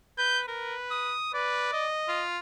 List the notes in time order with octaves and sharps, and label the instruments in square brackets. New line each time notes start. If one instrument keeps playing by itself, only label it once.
[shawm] B4 [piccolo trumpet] G6
[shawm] A#4 [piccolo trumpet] B4
[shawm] D#6
[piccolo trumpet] B4 [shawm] D5
[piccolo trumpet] D#5
[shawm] F4